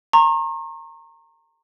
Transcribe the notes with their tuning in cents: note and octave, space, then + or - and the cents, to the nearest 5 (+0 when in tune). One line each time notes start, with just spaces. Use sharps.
A#5 -20 C#6 -45